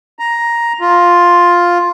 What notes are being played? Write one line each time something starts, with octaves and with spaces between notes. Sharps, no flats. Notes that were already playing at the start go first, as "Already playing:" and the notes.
A#5
F4